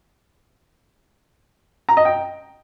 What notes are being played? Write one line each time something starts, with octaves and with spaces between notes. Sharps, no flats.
A#5
D#5
G5